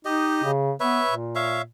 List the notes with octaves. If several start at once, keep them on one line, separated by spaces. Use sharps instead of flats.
D#4 G4 D#5
C#3
B3 B4 C#5 E5
A#2
C#5 E5 F5